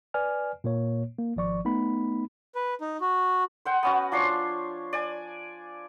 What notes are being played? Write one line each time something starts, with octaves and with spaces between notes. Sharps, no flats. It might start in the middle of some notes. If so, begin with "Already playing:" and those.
B4 D5 G#5 F6
A#2 A#3 C#5
A#3
G#1 F3 D5 C#6
A3 B3 D#4 B5
B4
D#4
F#4
C5 F#5 G5
B3 C#4 F#4
F3 D4 C#5 C6
D5 G#5